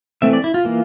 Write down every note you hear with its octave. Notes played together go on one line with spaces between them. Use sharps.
E3 A3 C4 E5
D5
E4
F4
E3 A#3